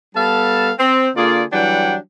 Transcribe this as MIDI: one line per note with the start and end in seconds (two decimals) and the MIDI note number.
0.15 0.72 55
0.15 0.72 59
0.15 0.72 69
0.15 0.72 77
0.15 0.72 81
0.79 1.09 60
1.16 1.44 50
1.16 1.44 58
1.16 1.44 65
1.16 1.44 68
1.16 1.44 74
1.53 1.96 52
1.53 1.96 54
1.53 1.96 55
1.53 1.96 62
1.53 1.96 78
1.53 1.96 79